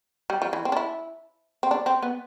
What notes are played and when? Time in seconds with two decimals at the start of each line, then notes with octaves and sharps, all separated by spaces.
0.30 G3
0.42 F3
0.53 E3
0.65 C4
0.72 D4
0.77 E4
1.63 C4
1.71 D4
1.86 C4
2.02 B3